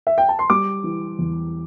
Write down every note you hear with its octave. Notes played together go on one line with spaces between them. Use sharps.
E5
G5
A5
C6
G3 D6
E3
E2